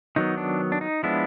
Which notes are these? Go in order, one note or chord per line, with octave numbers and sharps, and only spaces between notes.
D#3 F#3 B3 D#4
D4
D4
D#4
F3 G#3 B3 D4 E4